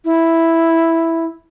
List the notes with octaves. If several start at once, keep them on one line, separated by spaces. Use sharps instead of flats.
E4